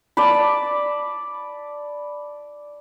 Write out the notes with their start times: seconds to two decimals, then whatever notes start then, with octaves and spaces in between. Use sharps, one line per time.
0.17 D5 A5 B5